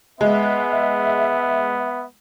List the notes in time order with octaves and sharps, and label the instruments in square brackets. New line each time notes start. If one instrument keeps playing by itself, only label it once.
[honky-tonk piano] G#3 [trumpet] B3 [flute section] E5